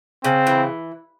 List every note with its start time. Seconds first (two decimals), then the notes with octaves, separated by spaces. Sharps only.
0.24 C#3 C4
0.47 E3